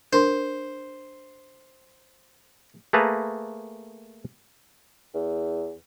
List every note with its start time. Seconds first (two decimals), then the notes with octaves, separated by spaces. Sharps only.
0.13 D4 A#4 C5 C6
2.93 A3 A#3 G#4 B4 A5 A#5
5.14 E2